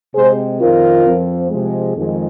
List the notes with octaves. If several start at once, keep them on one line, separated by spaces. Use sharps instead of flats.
C3 G#3 C4 G#4 C5
F2 D#3 C4 F4 A#4
F2 F3 C4
C3 F3 G#3
F2 D#3 G#3